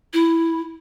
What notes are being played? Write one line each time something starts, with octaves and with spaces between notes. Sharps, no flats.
E4